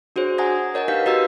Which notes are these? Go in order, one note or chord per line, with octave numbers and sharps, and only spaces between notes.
D4 F#4 G#4 C5 C#5
F#5 G#5 A#5 D#6 G#6 A#6
A#4 C#5 D#5 F#5 A#5
D#4 G4 B4 F5 G6 B6
F#4 G4 B4 D#5 A#5 E6